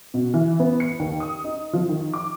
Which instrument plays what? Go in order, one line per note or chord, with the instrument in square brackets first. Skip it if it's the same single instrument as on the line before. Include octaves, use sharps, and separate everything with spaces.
[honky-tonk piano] B2
E3
B3
C#7
D#2
D#6
D#4
F3
D#3
D6